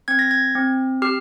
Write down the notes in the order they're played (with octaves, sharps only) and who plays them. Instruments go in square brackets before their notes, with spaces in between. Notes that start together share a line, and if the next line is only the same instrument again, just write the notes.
[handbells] C4 G#6
A#6
G#6
C4
G4 F6